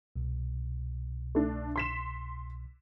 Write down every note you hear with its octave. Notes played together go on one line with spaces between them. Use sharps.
C2 B2
A3 D4
C6 B6 E7